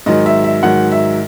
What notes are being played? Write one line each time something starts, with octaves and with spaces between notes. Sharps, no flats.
G#2 D#3 F#3 D#5
E5
E5
G#2 D#3 F#3 F#5
E5